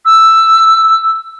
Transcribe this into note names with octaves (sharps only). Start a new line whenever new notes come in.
E6